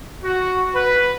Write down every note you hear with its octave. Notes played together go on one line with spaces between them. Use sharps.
F#4
B4